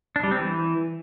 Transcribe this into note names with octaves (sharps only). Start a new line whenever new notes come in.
D4
G3
C4
E3